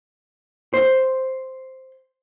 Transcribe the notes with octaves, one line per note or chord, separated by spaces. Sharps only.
C5